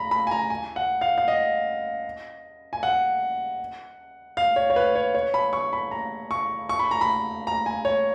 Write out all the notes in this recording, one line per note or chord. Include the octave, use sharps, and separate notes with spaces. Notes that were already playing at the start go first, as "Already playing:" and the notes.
Already playing: A#5 B5
B5
G#5
A#5
G#5
F#5
F5
F5
D#5
G#5
F#5
F5
C#5
C#5
B4
C#5
C#5
B5
C#6
B5
A#5
C#6
C#6
B5
A#5
B5
A#5
G#5
C#5